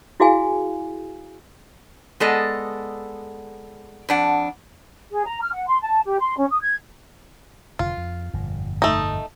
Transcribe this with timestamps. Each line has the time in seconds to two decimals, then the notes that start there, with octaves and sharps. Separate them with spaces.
0.20 E4 F#4 G#4 F5 G#5
2.20 G#3 B3 A4 D5 D#5
4.09 F2 D4 F#5
5.10 G#4
5.25 A#5
5.42 F6
5.53 F#5
5.67 C6
5.80 A5
6.03 G4
6.19 C6
6.36 C#4
6.49 D#6
6.61 G#6
7.79 F1 D3 F4
7.97 F2
8.34 G1 F2 A#2
8.82 A3 D#4